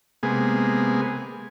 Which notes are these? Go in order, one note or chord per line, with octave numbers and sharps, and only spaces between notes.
C3 G#3 A#3 B3 G#4